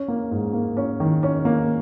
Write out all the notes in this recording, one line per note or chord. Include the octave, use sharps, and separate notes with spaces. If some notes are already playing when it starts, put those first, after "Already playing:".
Already playing: C#4
A#3
G#2
A#3
C#4
D#3
C#4
A#3